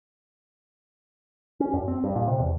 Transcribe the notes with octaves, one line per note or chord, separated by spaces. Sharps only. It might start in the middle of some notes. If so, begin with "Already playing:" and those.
C#4
F#2
C4
G2
A#2
C3
E2